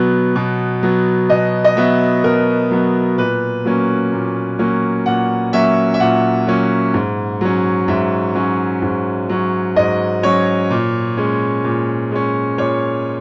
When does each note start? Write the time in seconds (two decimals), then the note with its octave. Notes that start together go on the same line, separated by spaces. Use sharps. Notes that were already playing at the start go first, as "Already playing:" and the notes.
Already playing: B2 F#3 B3
0.36 B2
0.83 F#3 B3
1.30 B2 D#5
1.64 D#5
1.77 F#3 B3 E5
2.24 B2 A#4
2.71 F#3 B3
3.18 A#2 B4
3.65 F#3 A#3 C#4
4.12 A#2
4.59 F#3 A#3 C#4
5.06 A#2 F#5
5.53 F#3 A#3 C#4 E5
5.94 E5
6.00 A#2 F#5
6.47 F#3 A#3 C#4
6.94 G#2
7.41 F#3 C#4
7.88 G#2 E5
8.35 F#3 C#4
8.82 G#2
9.29 F#3 C#4
9.76 G#2 D#5
10.23 F#3 C#4 C#5
10.70 A#2
11.17 G#3 C#4
11.64 A#2
12.11 G#3 C#4
12.58 A#2 C#5